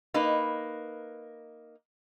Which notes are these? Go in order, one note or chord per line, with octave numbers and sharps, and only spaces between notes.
A#3 D#4 B4